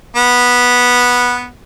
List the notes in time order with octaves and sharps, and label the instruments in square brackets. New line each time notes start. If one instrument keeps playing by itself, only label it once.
[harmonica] B3 F#5